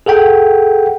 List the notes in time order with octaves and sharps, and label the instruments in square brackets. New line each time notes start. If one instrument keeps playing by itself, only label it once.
[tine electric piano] G#4 A4 F#5 G5